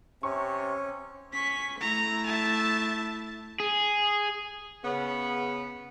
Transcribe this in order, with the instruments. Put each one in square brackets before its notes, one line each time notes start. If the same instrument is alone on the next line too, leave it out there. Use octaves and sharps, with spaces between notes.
[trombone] C3 [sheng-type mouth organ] C#4 [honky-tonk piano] C#6
[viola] C#4 C#6 [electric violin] B6
[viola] A3 E4 [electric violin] A#5
[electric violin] E5 A5
[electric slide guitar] G#4
[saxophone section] C#3 B3